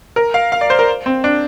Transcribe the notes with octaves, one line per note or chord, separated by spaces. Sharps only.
A#4
F5
F5
D5
C5
A#4
C4
D4